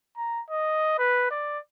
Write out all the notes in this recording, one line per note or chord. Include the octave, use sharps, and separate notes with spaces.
A#5
D#5
B4
D5